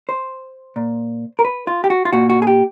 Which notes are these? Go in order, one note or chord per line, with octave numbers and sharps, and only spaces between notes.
C5
A#2
A#4
B4
F4
G4
F#4
F4
A#2 F#4
F#4
G#4
G4